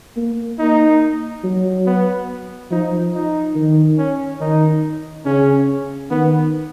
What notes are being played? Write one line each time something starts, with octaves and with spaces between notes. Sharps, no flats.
A#3
A#3 D#4
F#3
B3
F3 D#4
D#4
D#3
C#4
D#3 D#4
C#3 C#4
D#3 B3